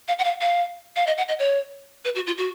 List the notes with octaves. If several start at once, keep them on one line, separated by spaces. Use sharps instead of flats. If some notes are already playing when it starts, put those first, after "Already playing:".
F5
F#5
F5
F5
F5
D#5
F#5
D#5
C#5
B4
F#4
F4
F#4